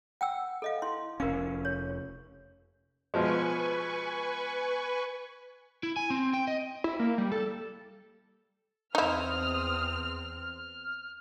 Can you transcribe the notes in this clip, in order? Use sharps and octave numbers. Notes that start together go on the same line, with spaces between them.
F#5 G5 E6
A4 D#5 F5
E4 C6
F1 C#4 A#4 F5
C#5
B2 F3 G#3 B4 G#5 C#6
E4
G#5
C4
G5
D#5
E4
A#3
G3
A4
E2 C4 D#4 E4 D#6 F6
F6